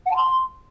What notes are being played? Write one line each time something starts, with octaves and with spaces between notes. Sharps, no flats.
F#5
A5
C6